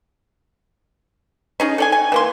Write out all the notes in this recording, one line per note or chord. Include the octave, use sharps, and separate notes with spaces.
C#4 D#4 G#4
A4 D5 G#5
G#5
E3 A#3 C6